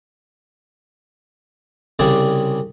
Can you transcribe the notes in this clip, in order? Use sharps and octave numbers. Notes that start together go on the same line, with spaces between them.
C2 C#3 G3 G#4 D5 A5